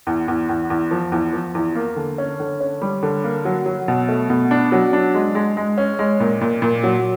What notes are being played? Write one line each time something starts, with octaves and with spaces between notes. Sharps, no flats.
E2
E2
E2
E2
F3
E2
F3
E2
A#3
D3
C#4
D3
C#4
G3
D3
A#3
F#3
F#3
B2
A3
B2
D4
F#3
D4
G#3
G#3
G#3
C#4
G#3
A#2
A#2
A#2
F#3